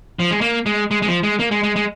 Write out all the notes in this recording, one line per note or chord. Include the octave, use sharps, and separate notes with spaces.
F3
G#3
A#3
G#3
G#3
G#3
F3
G#3
A#3
G#3
G#3
G#3